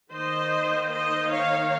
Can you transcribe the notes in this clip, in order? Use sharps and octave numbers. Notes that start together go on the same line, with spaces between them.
D#3 A#3 D#4 C5 D#5
C5 D#5
C#5 F5